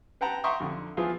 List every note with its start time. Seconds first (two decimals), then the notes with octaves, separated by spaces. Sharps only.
0.21 B4 F#5 G5 A5 A#5
0.44 E5 G5 A#5 C6 C#6 D#6
0.60 F2 D3
0.97 E3 F3 B3 F4 G#4